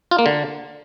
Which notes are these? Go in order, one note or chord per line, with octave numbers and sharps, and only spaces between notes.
F4
A#3
D3